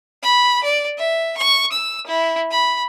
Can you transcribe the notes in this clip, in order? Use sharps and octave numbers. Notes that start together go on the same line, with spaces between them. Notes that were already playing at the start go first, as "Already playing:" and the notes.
B5
D5
E5
C#6
E6
E4
B5